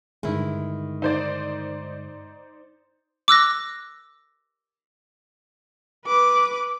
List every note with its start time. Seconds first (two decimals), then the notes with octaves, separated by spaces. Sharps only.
0.23 G2 D3 D#3 G#3 E4
1.02 D#4 C5 D5
3.28 D6 E6 F#6 A#6
6.06 B4 D6